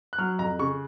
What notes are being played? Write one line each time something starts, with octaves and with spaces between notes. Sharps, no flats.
F#6
F#3 F6
F2 A#5
C#3 C#6